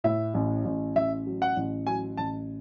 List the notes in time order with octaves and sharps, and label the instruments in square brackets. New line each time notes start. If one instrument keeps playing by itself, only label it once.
[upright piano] A2 [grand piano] E5
[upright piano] A1
A1
[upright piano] A1 [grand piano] E5
[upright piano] F#3
[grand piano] F#5
[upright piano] A1
[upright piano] F#3 [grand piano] G#5
[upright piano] A1 [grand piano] A5